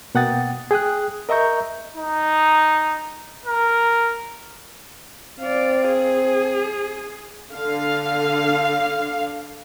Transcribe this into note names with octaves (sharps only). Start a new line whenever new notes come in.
B2 A#3 F#5 G5 D#6 A6
G#4 G5 D#6 F#6
A#4 D#5 E5 A#5 C#6 G6
D#4
A#4
C4 D5 F5
G#4
D3 F5